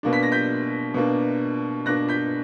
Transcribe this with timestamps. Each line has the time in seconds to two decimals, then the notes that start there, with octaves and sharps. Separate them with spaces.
0.03 B2 A#3 D4
0.13 B6
0.23 A#6
0.32 G6 B6
0.94 B2 A#3 D4
1.86 B2 A#3 D4 F#6 A#6
2.09 G6 B6